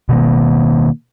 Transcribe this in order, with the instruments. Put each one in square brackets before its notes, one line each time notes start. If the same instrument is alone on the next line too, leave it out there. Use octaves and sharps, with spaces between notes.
[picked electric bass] B2 D#3 A#3